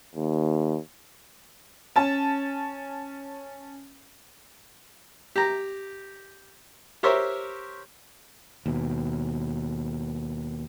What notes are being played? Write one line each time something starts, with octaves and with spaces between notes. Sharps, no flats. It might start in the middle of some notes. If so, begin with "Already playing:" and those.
D#2
C#4 A5
G4 A#5
G4 A#4 C5 C#5 E5
D#2 B2